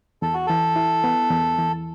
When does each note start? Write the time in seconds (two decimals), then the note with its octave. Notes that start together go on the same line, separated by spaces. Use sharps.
0.22 E2 A4
0.34 F#4
0.47 E3 A4
0.76 E4
1.04 B3
1.30 E2
1.58 E3